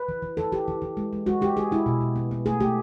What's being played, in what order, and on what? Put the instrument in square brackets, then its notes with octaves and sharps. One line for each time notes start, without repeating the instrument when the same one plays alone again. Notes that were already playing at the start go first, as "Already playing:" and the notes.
Already playing: [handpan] B4
E3
E3
E3 A4
E3 G4
E3
E3
G#3
G#3
G#3 F#4
G#3 G4
G#3 G#4
G#3 E4
B2
B2
B3
B3
A3 G#4
A3 G4